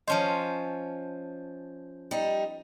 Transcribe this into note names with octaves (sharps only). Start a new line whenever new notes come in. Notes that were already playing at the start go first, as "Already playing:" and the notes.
F3 C#4 C5 D#5 A5
G3 D#4